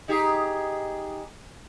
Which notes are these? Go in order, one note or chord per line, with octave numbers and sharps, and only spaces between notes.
D#4 G4 G#4